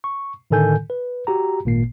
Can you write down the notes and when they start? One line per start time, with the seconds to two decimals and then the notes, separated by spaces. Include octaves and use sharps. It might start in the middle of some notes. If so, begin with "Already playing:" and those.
0.04 C#6
0.51 A2 D3 D#3 A4 G#5 G6
0.90 B4
1.27 F#4 G4 A#5
1.65 G#1 A#2 A#3 C7